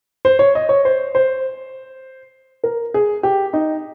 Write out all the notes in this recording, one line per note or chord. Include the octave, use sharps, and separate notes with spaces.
C5
C#5
D#5
C#5
C5
C5
A#4
G#4
G4
D#4